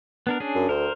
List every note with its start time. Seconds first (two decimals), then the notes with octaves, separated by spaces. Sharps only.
0.27 B3 D4 A#4
0.40 C#4 D4 G#4
0.55 F#2
0.69 D2 A#4 C5